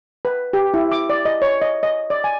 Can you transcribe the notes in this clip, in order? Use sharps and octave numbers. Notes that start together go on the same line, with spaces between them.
B4
G4
E4
D6
D5
D#5
C#5
D#5
D#5
D5
G#5